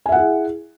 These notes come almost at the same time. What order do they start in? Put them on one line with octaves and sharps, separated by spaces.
G#5 E5 F#5 G#4 E4